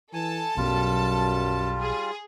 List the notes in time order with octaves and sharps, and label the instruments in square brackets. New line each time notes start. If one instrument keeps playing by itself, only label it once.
[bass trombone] E3 [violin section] A4 A5 [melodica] G#5
[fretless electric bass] B1 B2 F#3 [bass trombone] F#2 [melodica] G3 F4
[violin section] G#4